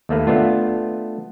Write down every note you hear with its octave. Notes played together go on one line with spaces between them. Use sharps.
D#2 A3 A#3 B4
A3 B3 D4 F4